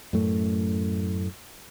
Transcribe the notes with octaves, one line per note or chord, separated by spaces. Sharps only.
F#2 A2 A3